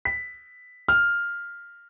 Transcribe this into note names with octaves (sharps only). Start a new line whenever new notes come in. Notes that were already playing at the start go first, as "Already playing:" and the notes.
B6
F6